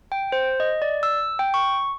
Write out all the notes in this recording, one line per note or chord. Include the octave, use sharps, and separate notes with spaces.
G5
C5
D#5
D5
E6
G5
C#6